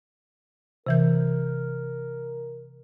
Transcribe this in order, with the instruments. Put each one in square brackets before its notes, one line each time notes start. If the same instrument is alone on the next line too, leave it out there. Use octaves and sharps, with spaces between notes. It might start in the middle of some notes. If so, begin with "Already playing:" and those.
[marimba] C3 E3 G6 [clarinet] A#4